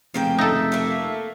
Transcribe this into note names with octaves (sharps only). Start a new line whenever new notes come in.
F1 C#3 A#3 G5
D#4 A4 E5
A3 A#3